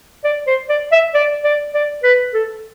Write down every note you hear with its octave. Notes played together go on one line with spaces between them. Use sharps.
D5
C5
D5
E5
D5
D5
D5
B4
A4